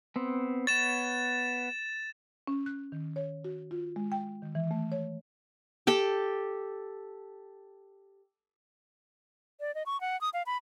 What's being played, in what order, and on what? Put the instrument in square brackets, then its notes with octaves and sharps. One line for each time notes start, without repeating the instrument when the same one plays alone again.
[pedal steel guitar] B3 C4
[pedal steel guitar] B3 C#5 [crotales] A6 E7
[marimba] C#4
F#6
D#3
C#5
F#4
F4
G#3
G5
D#3
E3
A3
C#5
[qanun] G4 A4 G5
[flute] D5
D#5
C#6
F#5
D#6
F5
B5